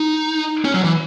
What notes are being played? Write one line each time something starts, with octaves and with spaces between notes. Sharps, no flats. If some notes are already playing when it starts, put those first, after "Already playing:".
Already playing: D#4
C#4
F#3
E3